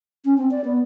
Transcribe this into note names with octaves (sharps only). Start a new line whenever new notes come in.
C#4
C4
D5
B3